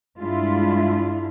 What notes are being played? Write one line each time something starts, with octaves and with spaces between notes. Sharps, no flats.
G2 G#3 D4 E4 F4